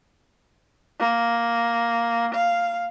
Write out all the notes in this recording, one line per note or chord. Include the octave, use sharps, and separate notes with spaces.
A#3
F5